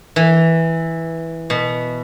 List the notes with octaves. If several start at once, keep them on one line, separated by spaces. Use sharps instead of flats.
E3
B2